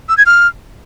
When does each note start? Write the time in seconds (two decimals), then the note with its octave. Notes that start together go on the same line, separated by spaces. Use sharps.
0.09 E6
0.18 G#6
0.26 F6